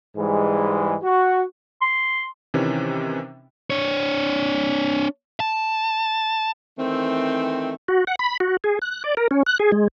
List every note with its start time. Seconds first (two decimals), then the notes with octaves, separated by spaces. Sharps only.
0.17 G#2 E3 G3 G#3
1.04 F#4
1.81 C6
2.54 C3 D#3 E3 C#4
3.70 D4 C#5
5.40 A5
6.78 D#3 E3 A3 C4
7.88 F#4
8.07 F#5
8.19 B5
8.40 F#4
8.64 G#4
8.82 F#6
9.04 D5
9.17 A#4
9.31 C#4
9.46 F#6
9.60 G#4
9.72 G#3